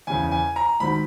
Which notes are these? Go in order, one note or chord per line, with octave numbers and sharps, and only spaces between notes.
E2 C#3 E3 G#5
G#5
A#5
G#2 D#3 F#3 B5